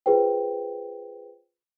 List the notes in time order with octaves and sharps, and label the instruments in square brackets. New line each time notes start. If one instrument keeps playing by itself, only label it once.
[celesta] F4 G#4 B4 C5 G5